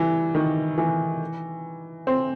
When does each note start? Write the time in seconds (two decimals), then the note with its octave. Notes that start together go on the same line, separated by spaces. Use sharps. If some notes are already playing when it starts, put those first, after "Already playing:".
Already playing: E3 G3
0.35 D#3
0.78 E3
2.07 C4